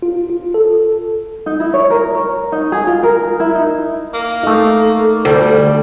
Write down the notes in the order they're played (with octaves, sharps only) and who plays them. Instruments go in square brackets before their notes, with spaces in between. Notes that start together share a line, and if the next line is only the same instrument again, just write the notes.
[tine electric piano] F4
F4
A4
[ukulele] D#4
E4
C#5
A#4
C#5
D#4
G#4
F4
A#4
E4
D#4
[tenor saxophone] A#3
[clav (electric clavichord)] A3 D#4 [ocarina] A4
[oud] D2 [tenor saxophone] G3